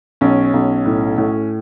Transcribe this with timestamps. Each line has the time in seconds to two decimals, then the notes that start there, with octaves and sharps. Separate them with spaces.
0.21 B1 C#4
0.54 B1
0.86 A2
1.18 A2